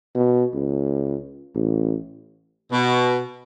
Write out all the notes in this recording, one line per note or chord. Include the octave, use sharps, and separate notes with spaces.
B2
C#2
A1
B2